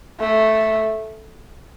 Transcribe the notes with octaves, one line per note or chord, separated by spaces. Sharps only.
A3